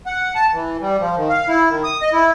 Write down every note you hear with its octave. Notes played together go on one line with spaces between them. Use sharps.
F#5
A5
E3
G3
F3
D#3
F5
E4
D#3
D#6
D#5
E4